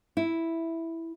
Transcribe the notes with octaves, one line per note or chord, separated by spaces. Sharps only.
E4